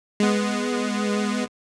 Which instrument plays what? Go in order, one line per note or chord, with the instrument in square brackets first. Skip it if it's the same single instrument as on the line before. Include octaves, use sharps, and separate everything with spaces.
[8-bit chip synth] G#3 B3